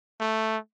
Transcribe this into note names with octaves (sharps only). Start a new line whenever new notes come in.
A3